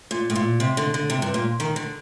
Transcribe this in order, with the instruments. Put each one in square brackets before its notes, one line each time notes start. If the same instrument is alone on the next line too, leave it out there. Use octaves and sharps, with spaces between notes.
[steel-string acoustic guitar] A#2
A2
A#2
C3
D3
D3
C3
G2
A#2
D#3
D3